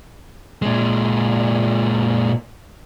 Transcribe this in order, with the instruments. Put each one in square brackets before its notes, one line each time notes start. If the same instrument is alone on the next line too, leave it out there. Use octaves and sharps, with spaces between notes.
[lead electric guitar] A#2 G#3